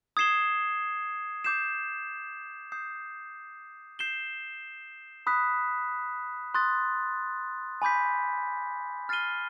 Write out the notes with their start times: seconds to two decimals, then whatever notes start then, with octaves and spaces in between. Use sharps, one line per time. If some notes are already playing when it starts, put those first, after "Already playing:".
0.17 D#6 G#6 C7 E7 G7
1.44 D6 G6 C7 E7
2.72 D#6 G6 C7
3.99 G6 C7 E7 G7
5.27 B5 D#6 F#6 B6
6.54 C6 D#6 F#6 A6
7.82 G#5 B5 D6 G6 B6
9.09 F6 A6 C7 D#7 G7